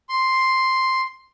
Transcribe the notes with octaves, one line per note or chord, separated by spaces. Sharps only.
C6